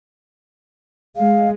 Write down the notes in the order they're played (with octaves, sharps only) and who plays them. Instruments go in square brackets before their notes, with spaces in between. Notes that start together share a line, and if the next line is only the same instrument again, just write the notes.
[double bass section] G#3 [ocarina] F5